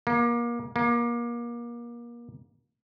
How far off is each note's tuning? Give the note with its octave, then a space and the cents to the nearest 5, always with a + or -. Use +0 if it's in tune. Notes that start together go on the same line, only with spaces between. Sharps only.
A#3 +30
A#3 +30